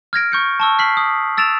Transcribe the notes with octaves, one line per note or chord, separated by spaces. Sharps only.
F6 G#6 A#6 D7
C#6 G6 C#7
A5 C#6 E6
F6 B6 C7 F#7
D#6
E6 A6 D7 E7 F7